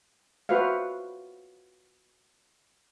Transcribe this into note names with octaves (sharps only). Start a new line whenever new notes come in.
F4 F#4 B4 C5 E5 F5